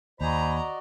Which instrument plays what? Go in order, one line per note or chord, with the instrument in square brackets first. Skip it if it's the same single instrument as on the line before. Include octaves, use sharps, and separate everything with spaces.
[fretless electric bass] D#2 [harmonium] F#4 D5 D#5 [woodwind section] C5 G#5 B5 [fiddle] A#5